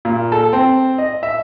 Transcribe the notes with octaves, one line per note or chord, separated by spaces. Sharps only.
A#2
A4
C4
D#5
E5